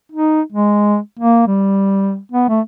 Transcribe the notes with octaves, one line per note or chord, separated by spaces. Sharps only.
D#4
G#3
A#3
G3
B3
A3